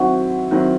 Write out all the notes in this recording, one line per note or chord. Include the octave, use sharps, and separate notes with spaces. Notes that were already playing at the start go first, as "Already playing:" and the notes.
Already playing: D#3 F#3 C4 E4 F#4
D#3 F#3 C4 E4